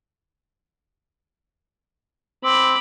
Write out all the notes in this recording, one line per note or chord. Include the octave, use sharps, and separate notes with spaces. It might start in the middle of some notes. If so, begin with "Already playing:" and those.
C4 B5 D6